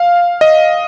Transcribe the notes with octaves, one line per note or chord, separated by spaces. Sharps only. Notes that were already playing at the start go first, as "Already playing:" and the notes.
Already playing: F5
D#5